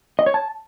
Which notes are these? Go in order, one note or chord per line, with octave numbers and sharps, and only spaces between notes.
D#5
C#5
A5